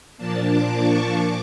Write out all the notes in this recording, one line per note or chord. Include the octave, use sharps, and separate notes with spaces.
A#2 F3 A#3 D4 A5
D6
C#6
A#2 D6